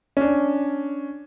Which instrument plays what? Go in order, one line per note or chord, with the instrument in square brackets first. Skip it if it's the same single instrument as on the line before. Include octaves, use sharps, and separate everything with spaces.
[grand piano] C#4 D4